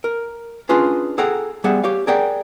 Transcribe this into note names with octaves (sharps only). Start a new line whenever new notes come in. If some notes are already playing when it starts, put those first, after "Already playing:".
A#4
C#4 D4 F4 G#4 B4 C6
G#4 A4 F#5 G5 A#5
G3 B3 G#4 E5 F#5
G4 C#5 F5
G#4 A#4 D5 F#5 G5